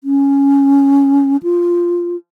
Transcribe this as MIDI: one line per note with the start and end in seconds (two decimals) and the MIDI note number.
0.04 1.37 61
1.43 2.16 65